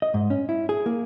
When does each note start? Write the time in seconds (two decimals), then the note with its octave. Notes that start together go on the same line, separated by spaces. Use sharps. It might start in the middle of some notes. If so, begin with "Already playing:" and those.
0.02 D#5
0.14 G#2
0.30 C#4
0.49 E4
0.69 G#4
0.86 A#3